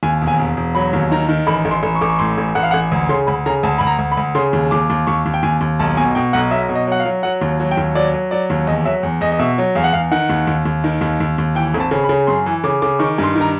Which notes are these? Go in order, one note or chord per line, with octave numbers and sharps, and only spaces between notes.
D#2 G#5
E1
G#5
E1
E1
F#3 B5
D#2
D#3 A#5
D#3
A1 B5
A1
C6
A1
C#6
A1 D6
C#6
A2 C6
A1
A1 F#5
F5
A1 F#5
D2
C#3 C6
D2 B5
C#3 A#5
D2 A5
D2 B5
A#5
D2
B5
D2
C#3 C6
D#2
D#2 D6
D#2
D#2 C#6
D#2
G5
D#2 G#5
D#2
B1 A5
B2 G#5
B2 G5
B1 F#5
F#3 E5
B2
D#5
F#3 F#5
F5
F#3
F#3 F#5
D#2
F#3
G5
D#2
F#3 D5
F#3
F#3 D5
D#2
E2 D#5
F#3 E5
E2
E2 D#5
D#5
B2 E5
F#3
E2 F5
F#5
E2 F5
D#3 F#5
D#2
D#2
D#2
D#3
D#2
D#2
D#2
E3 G5
G#1
A5
C#3
B5
C#3
F#2 C6
E3
C#3 D6
C#3 D6
D#3 C#6
G2 C6
D#3
A#5